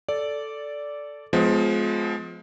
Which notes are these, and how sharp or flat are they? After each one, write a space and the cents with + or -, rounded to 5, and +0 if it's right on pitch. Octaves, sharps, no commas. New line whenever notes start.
A4 +0 D5 -10
F3 +15 G#3 +30 B3 +40